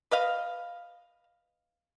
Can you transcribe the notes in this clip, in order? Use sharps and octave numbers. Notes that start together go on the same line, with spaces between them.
B4 D#5 F5